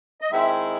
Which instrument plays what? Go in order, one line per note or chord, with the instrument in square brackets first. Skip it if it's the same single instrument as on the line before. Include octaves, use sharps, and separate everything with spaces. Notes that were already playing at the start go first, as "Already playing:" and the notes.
[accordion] D#5
[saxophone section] D#3 G#3 C4 E4 G#4 [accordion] E5